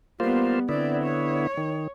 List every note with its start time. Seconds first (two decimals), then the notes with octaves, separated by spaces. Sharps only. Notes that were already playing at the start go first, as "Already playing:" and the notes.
0.20 G3 A#3 B3 F4 C5
0.69 D3 B3 C4 E4 D5
1.03 C#5
1.57 D#3